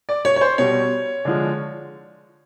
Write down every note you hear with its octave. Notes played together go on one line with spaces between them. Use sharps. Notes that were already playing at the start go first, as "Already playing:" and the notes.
D5
C#5
C#5
C5
B2 G3 C#5
D3 F3 G#3